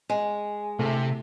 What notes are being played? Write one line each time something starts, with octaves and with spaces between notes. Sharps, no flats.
G#3
C3 A3